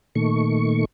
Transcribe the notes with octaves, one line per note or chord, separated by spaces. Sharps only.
A#2 D#3 A3 C#6